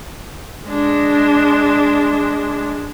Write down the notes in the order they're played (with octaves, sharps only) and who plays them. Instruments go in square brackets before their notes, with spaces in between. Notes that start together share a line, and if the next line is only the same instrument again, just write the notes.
[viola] G#3 D4